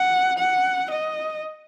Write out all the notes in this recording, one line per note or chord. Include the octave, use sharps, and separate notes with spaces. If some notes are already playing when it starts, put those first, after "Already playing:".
Already playing: F#5
F#5
D#5